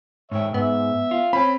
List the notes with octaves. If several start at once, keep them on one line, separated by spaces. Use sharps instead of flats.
G#2 C#5 E5 G5
G#2 B3 E5
F4
C4 C#4 B5